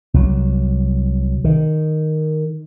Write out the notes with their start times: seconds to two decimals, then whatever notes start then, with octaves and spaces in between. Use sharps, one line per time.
0.14 C2 F#3
1.44 D#3